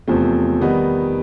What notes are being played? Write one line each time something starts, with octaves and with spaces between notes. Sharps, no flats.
E2 C3 F3 A3 C4
D#3 G3 B3 D#4